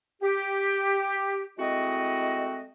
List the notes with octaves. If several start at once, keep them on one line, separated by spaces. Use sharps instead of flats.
G4
G#3 A3 C4 E4 F#4 D#5